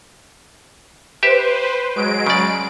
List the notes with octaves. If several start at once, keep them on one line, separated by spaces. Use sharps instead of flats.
G4 B4 C5 E5
F#3 G#3 D7
C#3 D5